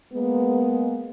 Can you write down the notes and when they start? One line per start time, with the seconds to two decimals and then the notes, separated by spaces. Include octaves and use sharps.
0.13 G#3 A#3 B3